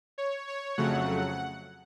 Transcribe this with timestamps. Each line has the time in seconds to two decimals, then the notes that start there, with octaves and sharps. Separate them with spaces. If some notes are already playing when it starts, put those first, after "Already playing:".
0.18 C#5
0.48 C#5
0.78 F2 C#3 F#3 A3 F#5